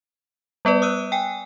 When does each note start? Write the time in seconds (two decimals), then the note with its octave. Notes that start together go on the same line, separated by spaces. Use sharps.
0.65 G3 B3 B4 D5
0.82 D#6 E6 F#6 D#7
1.12 G5 G#5